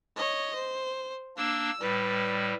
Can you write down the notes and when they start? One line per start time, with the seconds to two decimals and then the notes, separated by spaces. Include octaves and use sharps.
0.16 C#5 D#5
0.55 C5
1.37 A#3 D4 E6
1.81 A2 G3 B4